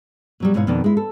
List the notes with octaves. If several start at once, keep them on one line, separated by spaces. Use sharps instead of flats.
B2 F#3 G3
G#2 B2 E4 C#5 F5
F2 B2 D#3 B3 D5
G#3 E4
A4